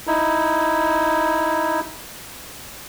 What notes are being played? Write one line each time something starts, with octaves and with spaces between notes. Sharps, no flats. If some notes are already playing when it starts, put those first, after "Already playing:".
D#4 E4